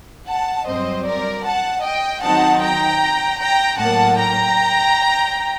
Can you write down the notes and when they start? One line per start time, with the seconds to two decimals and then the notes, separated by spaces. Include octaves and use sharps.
0.27 F#5 A5
0.66 G2 F#3 C4 C5 D#5
1.05 A#4 D5
1.44 F#5 A5
1.83 D#5 G5
2.22 D#3 F#3 C4 D#4 F#5 A5
2.61 G5 A#5
3.39 G5 A#5
3.79 A2 F#3 A#3 F#5 A5
4.18 G5 A#5